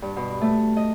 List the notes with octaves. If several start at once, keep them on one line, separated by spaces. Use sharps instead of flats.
G2
B2
A3
D#5